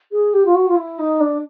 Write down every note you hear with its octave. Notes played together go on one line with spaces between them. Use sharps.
G#4
G4
F4
F#4
F4
E4
D#4
D4